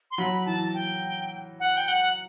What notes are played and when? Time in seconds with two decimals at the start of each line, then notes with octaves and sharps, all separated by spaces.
0.11 C6
0.18 F#3 B5
0.46 E3 A5
0.74 G5
1.60 F#5
1.77 G5
1.88 F#5